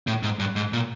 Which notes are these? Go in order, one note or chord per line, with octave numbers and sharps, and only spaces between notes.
A2
G#2
G2
G#2
A#2